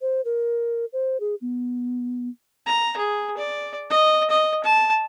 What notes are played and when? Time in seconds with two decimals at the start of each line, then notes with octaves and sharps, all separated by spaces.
0.01 C5
0.25 A#4
0.93 C5
1.20 G#4
1.41 B3
2.66 A#5
2.97 G#4
3.38 D5
3.90 D#5
4.30 D#5
4.64 A5